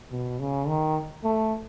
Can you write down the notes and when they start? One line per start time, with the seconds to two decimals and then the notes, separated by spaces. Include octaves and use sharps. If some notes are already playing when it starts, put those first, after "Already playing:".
0.11 B2
0.39 C#3
0.68 D#3
1.24 A3